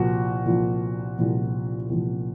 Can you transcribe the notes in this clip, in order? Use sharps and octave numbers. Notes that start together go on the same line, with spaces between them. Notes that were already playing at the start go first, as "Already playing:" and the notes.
Already playing: C2 A#2 F3 F#4
C2 A#2 F3
C2 A#2 F3
C2 A#2 F3